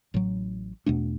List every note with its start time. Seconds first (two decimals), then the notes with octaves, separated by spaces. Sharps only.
0.14 A1 A2 F#3
0.86 E2 B2 A3 D4